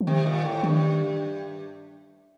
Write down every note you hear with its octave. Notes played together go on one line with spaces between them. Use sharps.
F3
C3 D#3
A#2
A2
G2 D#3